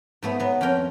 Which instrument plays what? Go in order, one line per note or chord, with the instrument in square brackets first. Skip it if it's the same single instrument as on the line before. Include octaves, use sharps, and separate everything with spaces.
[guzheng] G#2 A3 B3
F#3 B3
F2 C#4 A#4 G5